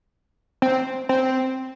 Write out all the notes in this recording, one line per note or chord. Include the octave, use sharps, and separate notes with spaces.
C4
C4